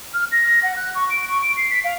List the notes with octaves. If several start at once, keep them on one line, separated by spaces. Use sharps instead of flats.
F6
A#6
F#5
F#6
C#6
D7
C#6
D7
C7
B6
F5